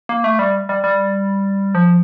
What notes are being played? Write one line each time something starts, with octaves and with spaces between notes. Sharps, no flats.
A#3
A3
G3
G3
G3
F3